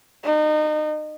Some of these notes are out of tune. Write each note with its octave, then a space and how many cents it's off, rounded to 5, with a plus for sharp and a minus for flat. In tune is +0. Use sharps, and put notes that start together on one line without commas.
D#4 -30